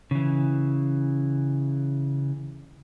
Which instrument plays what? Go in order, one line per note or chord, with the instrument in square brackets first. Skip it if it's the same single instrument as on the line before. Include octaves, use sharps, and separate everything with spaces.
[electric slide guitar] C#3 E3